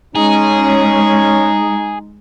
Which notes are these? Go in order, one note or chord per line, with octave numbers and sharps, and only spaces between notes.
G#3 C#4 D#4 G#4